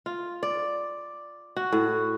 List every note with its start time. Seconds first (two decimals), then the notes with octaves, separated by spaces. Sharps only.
0.06 F4
0.43 D5
1.56 F#4
1.72 A2